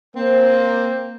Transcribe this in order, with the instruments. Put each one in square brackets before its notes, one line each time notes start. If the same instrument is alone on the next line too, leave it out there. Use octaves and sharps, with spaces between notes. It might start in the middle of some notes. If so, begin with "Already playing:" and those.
[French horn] A#3 [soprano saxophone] C4 [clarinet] C5